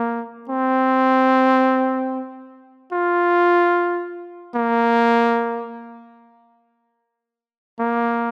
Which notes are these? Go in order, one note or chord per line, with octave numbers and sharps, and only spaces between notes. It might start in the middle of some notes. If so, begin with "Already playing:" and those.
Already playing: A#3
C4
F4
A#3
A#3